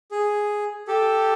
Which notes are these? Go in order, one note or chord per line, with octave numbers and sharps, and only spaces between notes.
G#4
G4 A4